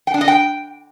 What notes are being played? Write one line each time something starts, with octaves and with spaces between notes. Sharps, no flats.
G5
D4
D#5
G5